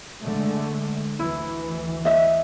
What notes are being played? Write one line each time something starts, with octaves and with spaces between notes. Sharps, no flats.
D3 G#3 A3
D2 E3 E4
D#5 E5